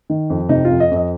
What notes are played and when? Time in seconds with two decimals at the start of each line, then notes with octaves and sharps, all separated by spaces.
0.10 D#3
0.30 F2
0.49 C3 D#4
0.65 F4
0.70 F2
0.80 D#5
0.91 F2
0.96 D#5